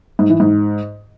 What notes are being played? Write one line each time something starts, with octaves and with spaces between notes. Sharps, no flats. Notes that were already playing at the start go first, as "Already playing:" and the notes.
G#2
E3
G#2